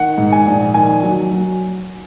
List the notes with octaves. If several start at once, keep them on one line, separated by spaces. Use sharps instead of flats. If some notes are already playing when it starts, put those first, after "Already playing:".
Already playing: D#3 F#5
G#2
G#5
A#1
D#3 G#5
F#3
F#3